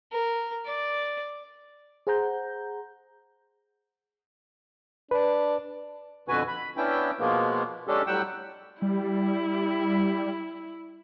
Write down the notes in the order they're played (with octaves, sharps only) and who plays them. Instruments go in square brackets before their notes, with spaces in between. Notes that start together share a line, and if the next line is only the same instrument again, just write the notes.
[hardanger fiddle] A#4
D5
[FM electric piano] G#4 C5 F#5 A#5 G6
[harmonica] D4 [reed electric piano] B4
[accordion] F2 B2 D3 F#4 B4 G#5
B5
B3 C#4 D4 E4 G5
B2 F3 G#3 A#3 B3
G#3 C#4 D4 G4 A4
A2 F#3 G3 F#5 G5 E6
[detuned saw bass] G3 [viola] E4